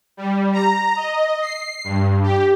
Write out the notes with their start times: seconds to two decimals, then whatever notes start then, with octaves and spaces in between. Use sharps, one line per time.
0.17 G3
0.53 A#5
0.96 D#5
1.42 C7
1.84 G2
2.23 G4